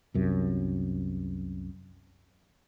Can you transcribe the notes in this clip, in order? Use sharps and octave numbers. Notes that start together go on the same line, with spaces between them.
C2 F#2 C3